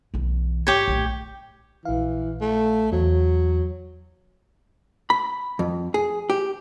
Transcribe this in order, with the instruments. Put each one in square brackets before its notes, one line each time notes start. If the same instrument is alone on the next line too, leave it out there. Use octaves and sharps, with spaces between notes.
[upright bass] B1 E3
[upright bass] G#1 [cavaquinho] G4 C#5
[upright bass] A#1 A2
[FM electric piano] A#1 F5 [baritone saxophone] E3
[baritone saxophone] A3
[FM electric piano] E2 [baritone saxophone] F#3
[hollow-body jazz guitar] B5
F2
G#4
G4